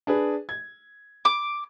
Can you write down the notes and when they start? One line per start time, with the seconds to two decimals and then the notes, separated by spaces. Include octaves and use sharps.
0.07 D4 G#4 B4
0.49 G#6
1.25 D6